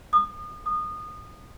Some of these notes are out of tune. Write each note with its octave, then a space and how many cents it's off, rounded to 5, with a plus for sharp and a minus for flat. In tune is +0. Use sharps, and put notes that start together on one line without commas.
D#6 -35
D#6 -25